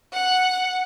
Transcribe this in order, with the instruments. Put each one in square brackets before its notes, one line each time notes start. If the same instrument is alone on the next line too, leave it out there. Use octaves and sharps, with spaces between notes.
[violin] F#5